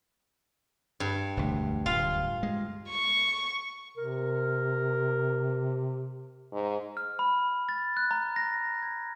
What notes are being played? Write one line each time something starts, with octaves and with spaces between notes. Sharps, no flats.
G2
E1 D2
D1 F4 F5
G#3
C#6
C3 A#4
G#2
F6
B5
A6
F#6
A#5
A#6
G#6